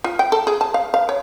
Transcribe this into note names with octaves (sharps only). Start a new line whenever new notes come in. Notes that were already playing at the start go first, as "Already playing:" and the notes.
F4
G5
A4
G#4
A5
F5
F5
C#5